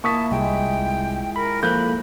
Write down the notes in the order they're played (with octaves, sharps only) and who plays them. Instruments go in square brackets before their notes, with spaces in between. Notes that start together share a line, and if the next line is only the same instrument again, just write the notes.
[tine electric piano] A#3 [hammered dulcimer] E4 F4 [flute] A5 [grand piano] C#6 D#6 B6
[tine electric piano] C2 [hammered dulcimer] G#3 [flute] G5
[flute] A#4 [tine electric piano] B5
[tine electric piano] F3 A#3 A4 [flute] B5 [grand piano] F#6 G6